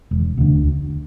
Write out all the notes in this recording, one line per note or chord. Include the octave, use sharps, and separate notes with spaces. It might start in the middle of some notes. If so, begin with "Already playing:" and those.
E1
D2 D3